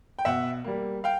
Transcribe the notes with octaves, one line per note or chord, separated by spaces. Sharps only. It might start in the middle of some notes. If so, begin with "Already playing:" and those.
G5
B2 E5 F#5
G3 A#3
F5 G5